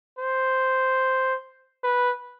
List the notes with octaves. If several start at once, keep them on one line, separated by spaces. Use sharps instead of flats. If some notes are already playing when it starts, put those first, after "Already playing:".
C5
B4